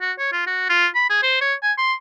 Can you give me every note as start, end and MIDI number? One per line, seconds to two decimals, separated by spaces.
0.01 0.13 66
0.19 0.32 73
0.33 0.43 65
0.47 0.67 66
0.70 0.87 65
0.95 1.09 83
1.10 1.21 68
1.23 1.40 72
1.41 1.54 73
1.63 1.72 80
1.78 1.94 84